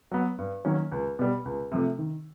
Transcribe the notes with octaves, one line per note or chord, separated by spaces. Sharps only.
F#3 B3
G2
D#3 F#3 A#3 C#4
C#2
B2 G3
C#2
C3 F3 A3
D#3